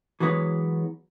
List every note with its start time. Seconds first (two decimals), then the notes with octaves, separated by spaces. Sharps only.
0.20 E3 F#3 G#3 B3 C#5